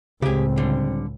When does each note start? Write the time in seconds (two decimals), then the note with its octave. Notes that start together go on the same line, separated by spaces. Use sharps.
0.22 C#2 A2 C#3 C4 G4 G#4
0.58 D3 G3